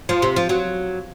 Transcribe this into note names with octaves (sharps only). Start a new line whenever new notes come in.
F3
C3
F3
F#3